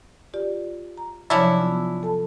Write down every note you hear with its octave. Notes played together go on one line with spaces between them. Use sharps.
F4 G4 D5
A#5
C3 F3 F#3 C#4 D4 E4
B3 F4
A4 A5